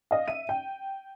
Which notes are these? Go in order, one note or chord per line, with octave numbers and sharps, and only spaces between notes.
D#5 F5
E5 D#7
G5